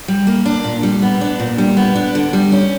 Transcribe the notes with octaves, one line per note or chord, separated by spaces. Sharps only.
G3
A#3
D4
A#2
G3
B3
D4
A#2
G3
B3
D4
D3
G3
C#4